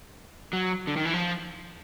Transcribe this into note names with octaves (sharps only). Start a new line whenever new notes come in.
F#3
D3
D#3
E3
F3